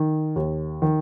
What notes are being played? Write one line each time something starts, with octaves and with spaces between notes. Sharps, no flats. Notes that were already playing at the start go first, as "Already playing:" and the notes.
Already playing: D#3
D#2
D#3